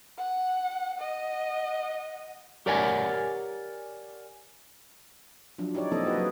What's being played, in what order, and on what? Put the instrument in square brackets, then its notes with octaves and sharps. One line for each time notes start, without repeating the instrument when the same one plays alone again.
[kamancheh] F#5
D#5 F#5
[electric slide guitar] G4 A#4 C#5 D5 F#5 G#5
[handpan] F3 F#3 D4
D#4 E4 G4 C#5 D5
F3 A#3 C4 E4 A4 D#5
E4 F#4 G#4 B4 D#5
F#3 B4